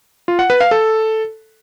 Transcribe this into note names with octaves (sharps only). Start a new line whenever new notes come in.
F4
F#5
B4
F5
A4